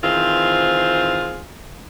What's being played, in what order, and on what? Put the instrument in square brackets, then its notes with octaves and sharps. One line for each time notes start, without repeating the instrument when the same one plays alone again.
[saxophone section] D#3 E3 C4 F4 G#4 C5